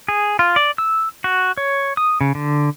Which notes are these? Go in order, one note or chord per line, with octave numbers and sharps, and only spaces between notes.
G#4
F4
D5
E6
F#4
C#5
D#6
C#3
D3